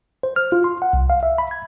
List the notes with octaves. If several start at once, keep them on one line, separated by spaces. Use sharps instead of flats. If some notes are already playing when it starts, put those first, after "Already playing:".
C5
F6
F4
C6
F#5
C2
F5
E5
B5
G#6